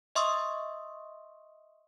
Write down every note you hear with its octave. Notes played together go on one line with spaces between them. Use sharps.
D#5 E5 C6 C#6 D#6 E6